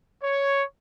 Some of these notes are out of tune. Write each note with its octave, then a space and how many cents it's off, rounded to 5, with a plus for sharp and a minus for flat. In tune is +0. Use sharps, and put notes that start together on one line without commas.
C#5 +5